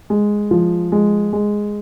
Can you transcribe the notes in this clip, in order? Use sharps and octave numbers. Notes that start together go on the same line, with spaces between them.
G#3
F3
G#3
G#3